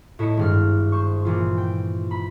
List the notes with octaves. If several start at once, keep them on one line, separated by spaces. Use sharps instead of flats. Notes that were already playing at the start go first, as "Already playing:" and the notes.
A2 E4 D#5 C#7
G#1 G2 F6
C5 C#6
A#2 E3 F4
G5
B5